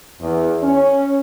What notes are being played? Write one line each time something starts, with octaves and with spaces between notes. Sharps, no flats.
E2
C#4